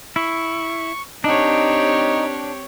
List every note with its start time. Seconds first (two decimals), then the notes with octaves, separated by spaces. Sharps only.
0.16 E4 C#6
1.24 C4 D4 D#4 G4 C#5